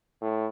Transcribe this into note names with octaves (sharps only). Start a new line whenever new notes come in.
A2